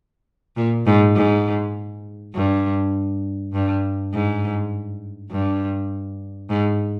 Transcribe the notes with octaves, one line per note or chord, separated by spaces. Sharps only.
A#2
G#2
G#2
G2
G2
G#2
G2
G#2